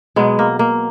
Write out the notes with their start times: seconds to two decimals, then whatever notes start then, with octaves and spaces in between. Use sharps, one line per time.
0.16 B2 F#3 G#3 B3
0.39 A#3
0.59 A#3